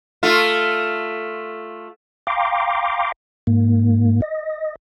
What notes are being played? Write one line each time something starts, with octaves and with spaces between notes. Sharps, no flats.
A3 F4
F5 G5 A#5 C6 D6
G#2 A#3
D#5